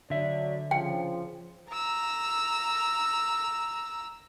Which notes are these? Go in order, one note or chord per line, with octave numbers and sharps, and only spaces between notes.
D3 F#3 D4 D5 E5
C#3 F3 G5
A#5 E6